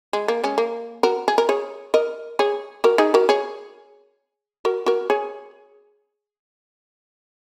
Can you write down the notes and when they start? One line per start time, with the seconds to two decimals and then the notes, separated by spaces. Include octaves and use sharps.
0.13 G#3
0.28 A#3
0.44 G#3 C#4
0.58 A#3
1.03 F#4 A#4
1.28 G#4
1.38 A#4
1.49 G#4 C#5
1.94 A#4 D#5
2.39 G#4 C#5
2.84 F#4 A#4
2.98 D#4 G#4
3.14 F#4 A#4
3.29 G#4 C#5
4.65 F#4 A#4
4.86 F#4 A#4
5.10 G#4 C#5